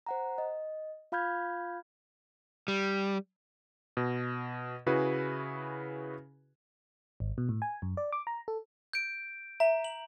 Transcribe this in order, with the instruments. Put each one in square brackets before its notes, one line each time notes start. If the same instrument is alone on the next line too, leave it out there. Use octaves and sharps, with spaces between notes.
[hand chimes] C5 F#5 A#5
D#5
F4 F5 B5 F6 G6 G#6
[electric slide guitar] G3
[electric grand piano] B2
C#3 E4 F#4 G#4 B4
[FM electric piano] G#1
B2
A2
G#5
F#2
D5
D6
A#5
A4
[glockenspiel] G6 D7
[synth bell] E5 [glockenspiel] A#5
[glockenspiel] F#7